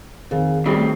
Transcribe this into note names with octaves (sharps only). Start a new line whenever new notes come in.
F2 D#3 G#4 A#4
C#3 F#3 G3 C4 G4 B5
A3